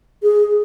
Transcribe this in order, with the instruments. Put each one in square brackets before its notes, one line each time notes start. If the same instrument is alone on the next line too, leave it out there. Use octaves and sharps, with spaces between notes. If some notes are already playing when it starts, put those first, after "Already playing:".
[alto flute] G#4